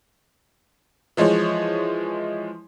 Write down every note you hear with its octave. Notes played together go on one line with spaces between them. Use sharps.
E3 F3 G#3 G#4 C#5